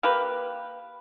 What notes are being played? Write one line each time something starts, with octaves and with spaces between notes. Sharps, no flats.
A#3 G4 B4